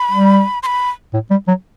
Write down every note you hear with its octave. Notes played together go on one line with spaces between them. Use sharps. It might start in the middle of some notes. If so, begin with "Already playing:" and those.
Already playing: B5
G3
C6
B5
A2
G3
F#3